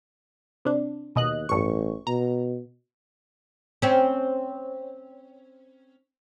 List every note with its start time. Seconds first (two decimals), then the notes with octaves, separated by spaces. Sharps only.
0.65 C3 D4
1.16 D#2 B2 D#5 F#6
1.49 A1 G2 C#6
2.07 B2 A#5
3.82 C4 C#4